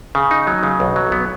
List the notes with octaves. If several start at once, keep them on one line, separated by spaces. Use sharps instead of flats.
C#3
D#4
F#3
C#3
B1
F#3
B3